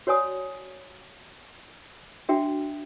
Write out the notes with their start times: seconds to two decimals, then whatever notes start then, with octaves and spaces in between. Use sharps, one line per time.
0.07 F#4 C#5 D5 G#5 D#6
2.29 D4 F#4 E5 G5